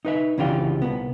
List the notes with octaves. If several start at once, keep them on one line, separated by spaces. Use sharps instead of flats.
D#4 B4 E5
C2 C#3 E3 D4 F4 G4
C2 B3